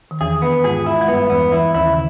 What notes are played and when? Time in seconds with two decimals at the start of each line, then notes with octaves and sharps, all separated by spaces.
0.11 D#3
0.21 E2 E3 G#4
0.42 B3
0.64 G#2 G#3 G#4
0.86 E4
1.01 G#3
1.08 G2 G3 B3
1.30 E2 E3 B3
1.52 E2 E3 E4
1.74 D#2 D#3 E4
1.87 C#3